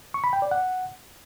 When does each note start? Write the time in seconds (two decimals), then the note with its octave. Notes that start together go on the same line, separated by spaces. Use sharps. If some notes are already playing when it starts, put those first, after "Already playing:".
0.14 C#6
0.24 B5
0.33 G5
0.42 D5
0.51 F#5